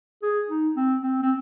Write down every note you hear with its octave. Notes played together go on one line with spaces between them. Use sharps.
G#4
D#4
C4
C4
C4